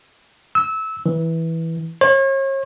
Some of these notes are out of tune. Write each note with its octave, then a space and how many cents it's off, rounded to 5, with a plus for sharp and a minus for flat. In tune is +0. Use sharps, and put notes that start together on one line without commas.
E6 -20
E3 -10
C#5 -40